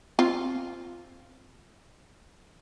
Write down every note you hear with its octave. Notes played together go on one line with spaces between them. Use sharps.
C4 F4 F5